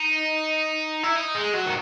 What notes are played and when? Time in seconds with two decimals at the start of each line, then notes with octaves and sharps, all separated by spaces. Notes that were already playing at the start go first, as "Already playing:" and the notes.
Already playing: D#4
1.03 E4
1.16 D#4
1.35 G#3
1.54 F#3
1.66 D#3